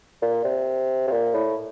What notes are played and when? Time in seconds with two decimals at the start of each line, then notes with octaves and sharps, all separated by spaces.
0.22 A#2
0.44 C3
1.08 C3
1.12 A#2
1.35 A2